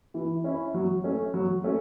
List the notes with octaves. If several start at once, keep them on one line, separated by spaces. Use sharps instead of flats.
E3
C#4 E4
F#3
A3 C#4
F#3
A3 C#4